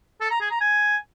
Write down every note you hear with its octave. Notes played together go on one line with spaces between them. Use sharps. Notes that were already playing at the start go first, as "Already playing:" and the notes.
A4
A#5
G#4
A#5
G#5